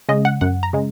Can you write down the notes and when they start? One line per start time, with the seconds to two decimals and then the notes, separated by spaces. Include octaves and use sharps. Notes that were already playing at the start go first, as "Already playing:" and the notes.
0.09 C#3 G#3 D#5
0.25 F#5
0.41 F#2 F#5
0.63 A#5
0.73 C#3 G#3